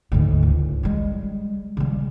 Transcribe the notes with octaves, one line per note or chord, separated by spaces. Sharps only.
D2 G#2
C#2
G3 G#3
C#3 G3